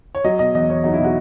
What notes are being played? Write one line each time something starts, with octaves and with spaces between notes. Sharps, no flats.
C#5
F#3 D#5
B2 D#5
E2 D#5
E2 C#5
F#3 D#4
E4
B2
F#4